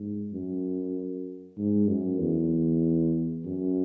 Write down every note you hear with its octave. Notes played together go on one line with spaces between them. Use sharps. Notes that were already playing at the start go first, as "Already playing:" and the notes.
Already playing: G#2
F#2
G#2
F#2
E2
F#2